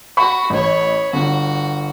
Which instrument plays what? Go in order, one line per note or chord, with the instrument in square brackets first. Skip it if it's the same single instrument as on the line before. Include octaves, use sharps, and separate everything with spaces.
[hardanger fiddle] F#4 [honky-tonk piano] B5 C#6
[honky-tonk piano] A1 [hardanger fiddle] C#5 B5
[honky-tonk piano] G1 [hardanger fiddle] F#4